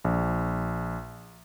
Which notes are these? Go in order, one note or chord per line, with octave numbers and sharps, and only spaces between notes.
A#1